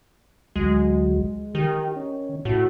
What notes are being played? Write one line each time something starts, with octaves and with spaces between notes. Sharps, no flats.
D2 F#3 G#3
D#3 G4
C#4
A2 F#4